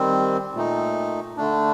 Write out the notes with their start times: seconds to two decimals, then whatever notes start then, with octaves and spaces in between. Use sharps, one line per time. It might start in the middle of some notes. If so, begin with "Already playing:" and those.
Already playing: D#3 G3 C4
0.54 A#2 A3 D#4
1.37 D3 A3 D4